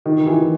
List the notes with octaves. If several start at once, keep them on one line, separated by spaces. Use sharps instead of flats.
D#3
E3